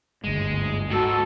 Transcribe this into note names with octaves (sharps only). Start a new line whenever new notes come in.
G1 D2 G#2 G#3
G#2 F#4 A4